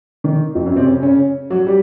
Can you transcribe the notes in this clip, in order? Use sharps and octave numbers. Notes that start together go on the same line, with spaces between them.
D#3
F2 F3
F#2 F#3
C3 C4
C#3 C#4
C#3 C#4
F#3 F#4
G3 G4